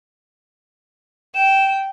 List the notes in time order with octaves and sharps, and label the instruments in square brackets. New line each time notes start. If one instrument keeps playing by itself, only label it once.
[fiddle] G5 [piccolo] E7